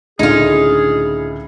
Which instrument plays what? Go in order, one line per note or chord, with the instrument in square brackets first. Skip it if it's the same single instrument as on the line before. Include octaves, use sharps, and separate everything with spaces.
[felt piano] C#2 A2 D3 [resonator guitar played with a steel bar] D#4 F4 [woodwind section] G#4